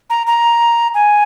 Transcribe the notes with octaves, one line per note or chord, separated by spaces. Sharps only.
A#5
A#5
G#5